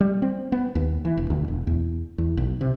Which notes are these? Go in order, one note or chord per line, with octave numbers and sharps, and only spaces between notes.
G3
C4
B3
D#2
E3
E1
D2
E1
E2
E2
B1
C3